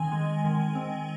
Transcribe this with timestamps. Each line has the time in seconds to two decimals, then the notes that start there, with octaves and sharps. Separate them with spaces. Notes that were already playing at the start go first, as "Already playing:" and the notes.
Already playing: D#3 C4 D#5 G#5
0.12 G#3
0.44 D#3
0.75 C4